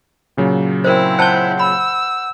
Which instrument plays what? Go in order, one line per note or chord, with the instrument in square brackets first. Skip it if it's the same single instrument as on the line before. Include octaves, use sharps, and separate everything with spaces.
[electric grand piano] A#2 C#3 F#3
[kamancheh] C4 E4 [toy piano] A#4 C5
[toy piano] C5 A5 [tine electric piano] F#5 G6
[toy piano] B5 [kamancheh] E6